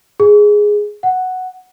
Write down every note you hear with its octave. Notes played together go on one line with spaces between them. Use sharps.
G#4
F#5